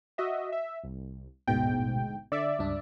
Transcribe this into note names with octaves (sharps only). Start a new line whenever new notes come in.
F#4 D#5 E5
E5
C2
A1 D2 G#2 B2 G5
D3 D5 E5
C#2 G2 D4